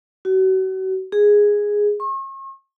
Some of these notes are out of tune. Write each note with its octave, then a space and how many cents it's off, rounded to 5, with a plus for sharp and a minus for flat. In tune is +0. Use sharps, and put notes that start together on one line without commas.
F#4 +35
G#4 -5
C#6 -40